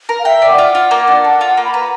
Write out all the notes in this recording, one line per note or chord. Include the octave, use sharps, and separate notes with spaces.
A#4
F5
E5 G5
D5
F#5
F4
F4
A#3
D4
A4
F4
A#3
B5
B4 A#5